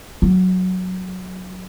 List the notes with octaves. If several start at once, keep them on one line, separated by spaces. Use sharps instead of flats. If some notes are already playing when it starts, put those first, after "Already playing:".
F#3